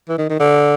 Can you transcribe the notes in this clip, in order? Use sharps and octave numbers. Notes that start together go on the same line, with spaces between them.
E3
D#3
D#3
D3